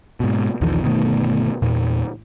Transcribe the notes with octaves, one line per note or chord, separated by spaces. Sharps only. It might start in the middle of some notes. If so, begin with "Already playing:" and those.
G#2 B2
B1 E2 D#3 F3
G1 B2 D#3 A3
E2 A#2